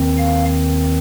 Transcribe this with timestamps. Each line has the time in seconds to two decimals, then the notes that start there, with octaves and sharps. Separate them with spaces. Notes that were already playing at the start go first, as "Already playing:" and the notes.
Already playing: D#2 D#3 C4
0.18 F5